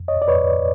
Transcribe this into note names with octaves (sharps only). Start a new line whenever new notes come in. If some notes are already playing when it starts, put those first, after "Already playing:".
Already playing: F2
C#5 D#5
D5
F2 B4 C#5